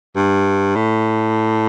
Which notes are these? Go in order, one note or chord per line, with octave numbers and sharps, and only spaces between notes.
G2
A2